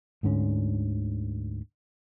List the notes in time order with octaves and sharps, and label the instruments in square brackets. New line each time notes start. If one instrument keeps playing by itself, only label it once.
[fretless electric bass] D2 G#2 D3 C#4